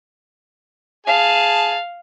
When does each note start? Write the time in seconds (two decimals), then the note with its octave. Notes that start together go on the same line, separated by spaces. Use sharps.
1.07 G#4 F5 A5